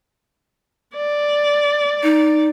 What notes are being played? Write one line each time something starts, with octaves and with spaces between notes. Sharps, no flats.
D5
D#4